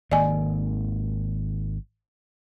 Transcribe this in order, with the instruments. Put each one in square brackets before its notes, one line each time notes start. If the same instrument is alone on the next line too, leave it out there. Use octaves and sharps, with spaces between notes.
[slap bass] G#1 D#3 A#3 [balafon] D5 D#5 G#5